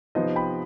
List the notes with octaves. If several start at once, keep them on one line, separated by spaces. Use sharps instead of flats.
C3 F3 B3 D#4 C5 D#5
G5 B5